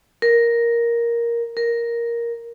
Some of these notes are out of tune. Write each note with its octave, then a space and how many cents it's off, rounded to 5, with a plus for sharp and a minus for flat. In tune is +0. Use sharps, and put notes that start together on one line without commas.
A#4 +5
A#4 +5